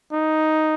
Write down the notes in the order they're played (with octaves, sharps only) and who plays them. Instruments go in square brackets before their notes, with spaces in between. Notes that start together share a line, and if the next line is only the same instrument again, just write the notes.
[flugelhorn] D#4